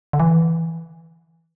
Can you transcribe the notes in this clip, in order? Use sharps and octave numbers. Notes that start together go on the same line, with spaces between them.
D3
E3